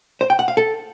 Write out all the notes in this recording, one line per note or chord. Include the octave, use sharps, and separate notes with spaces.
C5
G5
F#5
F5
A4